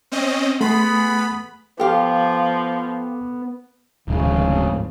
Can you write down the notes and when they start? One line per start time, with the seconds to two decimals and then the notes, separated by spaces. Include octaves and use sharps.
0.12 C4 C#4 D#5
0.61 A3 B3 G#4 F#5 B5 C6
1.80 F3 B3 G4 A4 F5 D6
4.08 D1 G#1 D2 C#3 F3